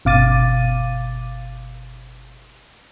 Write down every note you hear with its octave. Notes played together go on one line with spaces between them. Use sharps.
G1 B2 F5 D6 A6 D#7